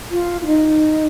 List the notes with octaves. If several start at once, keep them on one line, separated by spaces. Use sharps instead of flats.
F4
F4
D#4